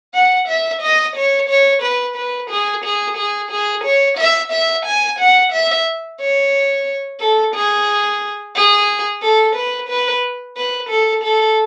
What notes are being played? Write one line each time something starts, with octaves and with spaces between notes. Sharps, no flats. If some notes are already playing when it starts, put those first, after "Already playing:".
F#5
E5
D#5
C#5
C#5
B4
B4
G#4
G#4
G#4
G#4
C#5
E5
E5
G#5
F#5
E5
C#5
A4
G#4
G#4
A4
B4
B4
B4
A4
A4